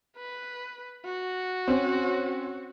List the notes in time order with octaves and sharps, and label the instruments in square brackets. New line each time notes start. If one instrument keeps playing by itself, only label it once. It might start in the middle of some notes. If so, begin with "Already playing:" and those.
[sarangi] B4
F#4
[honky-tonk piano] C4 C#4